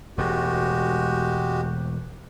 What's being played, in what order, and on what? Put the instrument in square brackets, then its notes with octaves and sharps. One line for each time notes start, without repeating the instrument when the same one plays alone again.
[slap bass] E1 A2 [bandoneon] G#3 F#4 G4